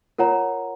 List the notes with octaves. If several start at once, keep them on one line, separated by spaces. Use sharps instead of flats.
F4 A#4 C#5 F#5 A#5